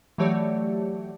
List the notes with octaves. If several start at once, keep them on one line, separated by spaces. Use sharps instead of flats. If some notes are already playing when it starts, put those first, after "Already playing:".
E3 F#3 A3 G4 C#5 D5